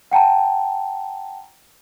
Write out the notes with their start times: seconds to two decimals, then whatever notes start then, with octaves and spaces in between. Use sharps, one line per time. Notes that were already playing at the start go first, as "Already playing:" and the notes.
0.11 F#5 G5 A5 A#5